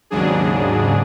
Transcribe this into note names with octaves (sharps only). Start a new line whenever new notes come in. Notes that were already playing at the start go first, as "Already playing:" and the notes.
D#2 G#2 C#3 F#3 D4 G#4